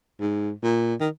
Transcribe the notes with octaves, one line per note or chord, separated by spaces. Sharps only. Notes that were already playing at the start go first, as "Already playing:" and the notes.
G#2
A#2
D#3